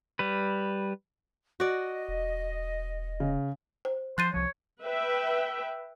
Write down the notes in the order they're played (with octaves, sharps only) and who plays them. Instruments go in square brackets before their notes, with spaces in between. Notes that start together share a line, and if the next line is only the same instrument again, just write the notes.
[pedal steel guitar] G3 B4
[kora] F#4 D5 [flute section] D#5
[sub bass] E1
[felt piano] C#3
[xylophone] C5
[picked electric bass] F3 [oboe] C5 [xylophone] F#6 A6 D#7
[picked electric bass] C2 F3 [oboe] C#5
[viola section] B4 E5 G5